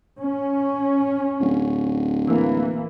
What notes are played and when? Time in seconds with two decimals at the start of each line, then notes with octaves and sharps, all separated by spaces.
0.19 C#4
1.41 D1
2.28 E3 A#3